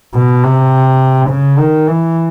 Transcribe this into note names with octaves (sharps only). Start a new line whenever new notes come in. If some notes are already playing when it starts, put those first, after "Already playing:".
B2
C3
C#3
D#3
E3